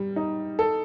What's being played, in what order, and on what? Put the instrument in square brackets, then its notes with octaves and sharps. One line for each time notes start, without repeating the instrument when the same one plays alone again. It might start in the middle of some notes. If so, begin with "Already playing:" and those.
Already playing: [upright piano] G3
D#4
A4